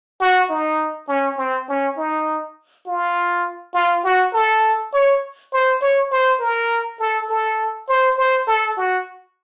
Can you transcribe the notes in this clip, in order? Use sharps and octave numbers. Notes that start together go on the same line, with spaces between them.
F#4
D#4
C#4
C4
C#4
D#4
F4
F4
F#4
A4
C#5
C5
C#5
C5
A#4
A4
A4
C5
C5
A4
F#4